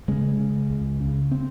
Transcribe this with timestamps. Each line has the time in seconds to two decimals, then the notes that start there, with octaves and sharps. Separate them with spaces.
0.08 C#3 G#3
0.40 C#3
0.70 C#2
1.00 C#3
1.31 C4